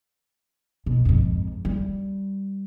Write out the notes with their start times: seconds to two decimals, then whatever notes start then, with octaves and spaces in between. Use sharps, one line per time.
0.86 B2
1.05 F2 G#2
1.65 G3